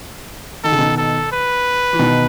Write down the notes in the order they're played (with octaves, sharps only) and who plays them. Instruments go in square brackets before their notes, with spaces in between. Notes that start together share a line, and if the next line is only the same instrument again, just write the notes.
[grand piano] D#3 [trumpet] A4
[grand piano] C#3
B2 D#3
[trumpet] A4
B4
[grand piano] E3
B2 D#3